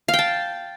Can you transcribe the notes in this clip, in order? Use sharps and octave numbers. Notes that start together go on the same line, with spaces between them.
F5
G5
A5